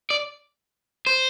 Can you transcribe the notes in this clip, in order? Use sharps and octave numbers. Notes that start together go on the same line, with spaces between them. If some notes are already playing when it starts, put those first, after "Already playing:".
D5
C5